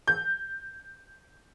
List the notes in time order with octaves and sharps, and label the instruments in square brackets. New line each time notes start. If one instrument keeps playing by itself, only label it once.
[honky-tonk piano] G6